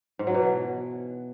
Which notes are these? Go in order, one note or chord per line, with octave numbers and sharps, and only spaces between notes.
G#2
F#3
B2
E3